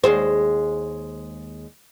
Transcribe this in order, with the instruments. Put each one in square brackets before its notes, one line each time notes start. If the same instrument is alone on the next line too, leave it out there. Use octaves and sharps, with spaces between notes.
[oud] D#2 G#3 C5